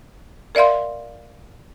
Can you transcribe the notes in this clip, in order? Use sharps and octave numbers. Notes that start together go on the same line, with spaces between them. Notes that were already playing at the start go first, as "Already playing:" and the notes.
A#4 D5 E5 F5 C6